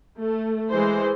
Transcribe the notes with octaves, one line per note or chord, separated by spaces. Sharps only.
A3
E3 G#3 C5